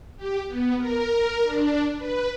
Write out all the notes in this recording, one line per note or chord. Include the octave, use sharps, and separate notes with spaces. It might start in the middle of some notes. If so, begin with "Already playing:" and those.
G4
B3
A#4
D4
B4